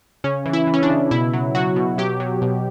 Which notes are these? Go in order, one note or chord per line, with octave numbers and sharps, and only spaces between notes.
C#3 C#4
E3
E4
E3
C#4
D4
C#3
B2 E4
F#3
F#3 F#4
B2
F#3 G4
F#3
B2